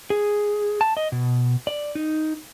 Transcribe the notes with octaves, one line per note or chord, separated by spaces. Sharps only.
G#4
A5
D#5
B2
D5
D#4